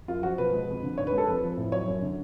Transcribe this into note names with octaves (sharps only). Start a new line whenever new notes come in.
F#2 F4
F3 F#4
B2 B4
G#3
F2
D3
G#2 C#5
B4
G#3
A4
F2 B4
F3
A2
F#3 C#5
F#2
D3